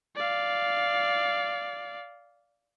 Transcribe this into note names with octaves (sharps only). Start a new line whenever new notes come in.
D5 F5